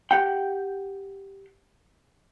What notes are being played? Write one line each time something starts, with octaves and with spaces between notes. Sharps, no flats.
G4 F#5 G5